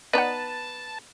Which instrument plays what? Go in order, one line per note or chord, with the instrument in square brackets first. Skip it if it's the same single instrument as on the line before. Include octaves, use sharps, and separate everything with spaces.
[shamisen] B3 D#4 [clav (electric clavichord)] B4 [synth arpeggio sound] D5 F#5 [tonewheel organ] A5